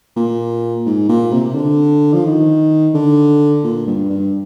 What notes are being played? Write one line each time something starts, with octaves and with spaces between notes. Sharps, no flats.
A#2
G#2
A#2
C3
D3
F3
D#3
D3
A#2
G2
G2